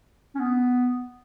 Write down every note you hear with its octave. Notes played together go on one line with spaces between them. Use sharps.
C#4
B3